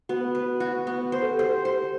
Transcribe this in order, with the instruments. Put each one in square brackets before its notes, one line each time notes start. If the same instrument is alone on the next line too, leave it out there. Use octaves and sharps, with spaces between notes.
[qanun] B3 [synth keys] F#4
[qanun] B4
F#4
B3
C5
[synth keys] A4
G4
[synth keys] A4 [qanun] C5
[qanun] C5